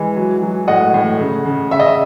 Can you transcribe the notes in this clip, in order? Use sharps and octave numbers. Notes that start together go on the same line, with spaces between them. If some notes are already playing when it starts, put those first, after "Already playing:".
Already playing: E3 G#3
F#3
F#3
A2 D#5 F#5
A2
C#3
C#3
C#3 E5
D#5
E5